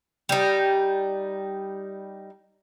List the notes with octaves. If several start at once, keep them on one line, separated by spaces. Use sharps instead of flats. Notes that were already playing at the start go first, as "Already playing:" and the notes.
G3 D#4